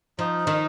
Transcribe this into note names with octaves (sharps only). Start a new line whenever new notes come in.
F3 D#4
D#3